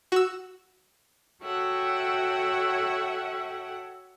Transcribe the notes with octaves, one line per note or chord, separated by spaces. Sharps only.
F#4 E6
F#4 A4 C#5 E5 F#5 G5